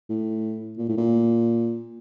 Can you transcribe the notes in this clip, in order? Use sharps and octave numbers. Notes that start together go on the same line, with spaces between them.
A2
A#2
A2
A#2